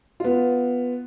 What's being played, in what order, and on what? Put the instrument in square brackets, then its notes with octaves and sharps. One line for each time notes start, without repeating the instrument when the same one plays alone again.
[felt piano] B3 F4